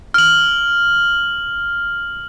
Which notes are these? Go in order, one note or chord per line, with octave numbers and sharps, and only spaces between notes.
F6 F#7